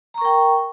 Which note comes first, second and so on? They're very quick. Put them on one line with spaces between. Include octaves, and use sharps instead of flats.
A#5 C#6 A#4 G5